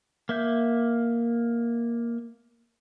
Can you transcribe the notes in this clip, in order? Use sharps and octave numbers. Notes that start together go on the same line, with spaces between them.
A#3 E5 G6